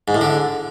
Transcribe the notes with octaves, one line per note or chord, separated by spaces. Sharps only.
G#2
A2
D3